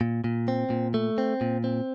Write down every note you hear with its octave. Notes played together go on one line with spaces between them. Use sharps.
A#2
A#2
C4
A#2
A3
C4
A#2
C4